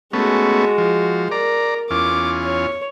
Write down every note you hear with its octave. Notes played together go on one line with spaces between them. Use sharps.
G#3 A3 B3 C#4 F#4
F3
A#4 D5 A#5
E2 C#4 F4 D6
C#5